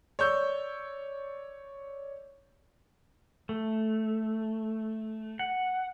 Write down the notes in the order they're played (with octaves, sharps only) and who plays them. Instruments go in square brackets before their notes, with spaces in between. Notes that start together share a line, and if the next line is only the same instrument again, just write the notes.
[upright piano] C#5 D5 C#6 E6 G6
[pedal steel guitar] A3
F#5